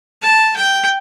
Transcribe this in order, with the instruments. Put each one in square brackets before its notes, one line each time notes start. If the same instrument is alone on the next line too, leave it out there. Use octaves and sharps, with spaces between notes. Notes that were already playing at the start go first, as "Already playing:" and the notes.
[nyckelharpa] A5
G5